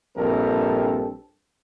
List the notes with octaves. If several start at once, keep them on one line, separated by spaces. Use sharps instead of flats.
A#1 G2 C4 G4 A4 A#4